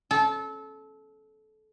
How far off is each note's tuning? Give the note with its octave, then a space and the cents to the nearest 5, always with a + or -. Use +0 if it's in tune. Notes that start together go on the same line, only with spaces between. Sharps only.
A4 -25